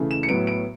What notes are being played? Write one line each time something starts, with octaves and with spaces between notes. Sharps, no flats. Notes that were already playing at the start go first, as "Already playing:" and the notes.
Already playing: C#3 E3 A3
E7
C#7
A2 F#3 B3 D7
D7